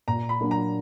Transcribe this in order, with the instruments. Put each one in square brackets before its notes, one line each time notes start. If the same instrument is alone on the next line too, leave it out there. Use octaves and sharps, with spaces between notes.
[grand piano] A#2 [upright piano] A#5
[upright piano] B5
[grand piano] F#3 A#3 D4
[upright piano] A#5